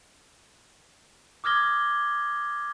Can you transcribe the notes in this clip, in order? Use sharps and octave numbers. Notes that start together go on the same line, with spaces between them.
D6 D#6 F6 G#6 A#6 G7